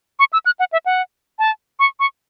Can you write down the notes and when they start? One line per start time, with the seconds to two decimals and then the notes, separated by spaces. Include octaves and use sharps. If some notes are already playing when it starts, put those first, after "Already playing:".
0.19 C#6
0.33 E6
0.46 F#6
0.59 F#5
0.72 E5
0.86 F#5
1.39 A5
1.79 C#6
2.00 C#6